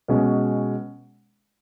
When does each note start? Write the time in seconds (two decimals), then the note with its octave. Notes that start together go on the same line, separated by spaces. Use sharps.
0.08 B2 G#3 C#4